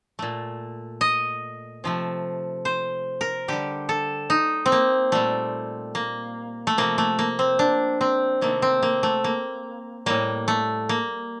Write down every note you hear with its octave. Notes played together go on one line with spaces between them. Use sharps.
A#2 A3
D#5
C3 F3 A3
C5
A#4
D3 G3 G4
A4
D#4
C4
A#3
A#2 G3 A3
A#3
A3
C3 F3 A3 A#3
A3
A#3
C4
D4
C4
C3 D#3 A3 A#3
C4
A#3
A3
A#3
A2 G3 A#3
A3
A#3